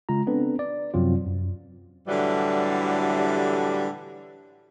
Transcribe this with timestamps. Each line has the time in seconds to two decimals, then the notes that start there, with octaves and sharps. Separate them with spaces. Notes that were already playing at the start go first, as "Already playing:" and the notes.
0.09 C#3 G#3 F4 A#5
0.27 B3 C4 D4 A4 B4
0.59 D5
0.94 F#2 C3 F3 F#3 C4 F4
1.26 F#2
2.08 A2 D3 E3 F#3 G3